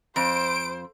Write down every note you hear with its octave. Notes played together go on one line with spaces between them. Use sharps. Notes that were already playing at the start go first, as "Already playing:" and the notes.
F2 C5 D7